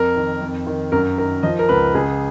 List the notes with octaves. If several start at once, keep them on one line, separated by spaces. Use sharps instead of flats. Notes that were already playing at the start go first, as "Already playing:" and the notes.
Already playing: F2 A#4
D#3
F2
D#3
F#2 A#4
D#3 A#4
F3 D#5
A#4
C#2 B4
C#2 G#4